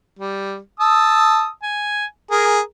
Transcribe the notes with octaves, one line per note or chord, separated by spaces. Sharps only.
G3
A5 D#6 E6
G#5
G#4 A#4